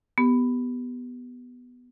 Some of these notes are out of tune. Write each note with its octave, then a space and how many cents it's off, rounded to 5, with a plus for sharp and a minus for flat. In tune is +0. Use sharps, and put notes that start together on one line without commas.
B3 +0 G4 +0